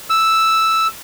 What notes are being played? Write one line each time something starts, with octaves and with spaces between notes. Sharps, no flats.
E6